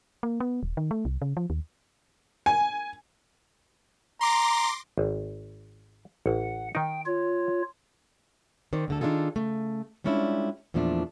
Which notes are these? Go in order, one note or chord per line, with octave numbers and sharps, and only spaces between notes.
A#3
B3
D#1
D#3
A3
C2
C#3
F3
D#2
G#5
A#5 C6 D6 A#6
G#1
A1 F#5
D#3 D#4 G5
F4 C#5
D#3 C4 D5
D2 D3 A4
D#3 D4 D#4 F4 G#4 A4
C#3 A3
G3 G#3 C#4 D4 E4 F4
E2 A#2 F3 A3 D4